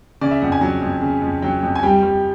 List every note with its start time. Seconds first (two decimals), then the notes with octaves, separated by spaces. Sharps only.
0.21 C#3 D5
0.31 E5
0.41 F2 F#5
0.52 G#5
0.61 F#3
0.82 F2
1.02 C#3
1.22 F2
1.42 F#3 G5
1.63 F2
1.75 G#5
1.83 G3 G5
2.03 G3